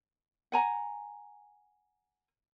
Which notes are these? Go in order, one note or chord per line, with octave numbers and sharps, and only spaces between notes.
F#5 G#5 A#5